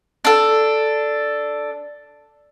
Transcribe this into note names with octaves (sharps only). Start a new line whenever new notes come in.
D4 A4